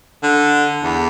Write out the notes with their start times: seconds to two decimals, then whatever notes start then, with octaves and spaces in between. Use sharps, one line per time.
0.23 D3
0.84 E2